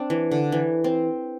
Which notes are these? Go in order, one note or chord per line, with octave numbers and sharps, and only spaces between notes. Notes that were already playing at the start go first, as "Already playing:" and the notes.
Already playing: C4 D4
E3
D3
E3
C4